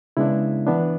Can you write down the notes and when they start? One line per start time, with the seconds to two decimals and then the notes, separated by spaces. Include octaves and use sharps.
0.17 C#3 G#3 B3 D4 E4
0.67 E3 B3 D4